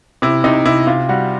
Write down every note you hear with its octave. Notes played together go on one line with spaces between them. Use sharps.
C3 E4
C3 D#4
C3 E4
C3 F4
G3 F#4